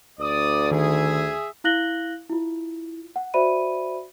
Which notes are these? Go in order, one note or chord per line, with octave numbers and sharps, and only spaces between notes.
D2 D5 D#6
D#3 G#4 E5 G#5
E4 F5 F#6 A#6 F#7 G7
E4 F4
F#5
F#4 C5 D5 E5 B5 D#7